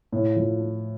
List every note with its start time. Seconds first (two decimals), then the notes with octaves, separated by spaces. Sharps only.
0.12 A2
0.36 F3
0.61 F4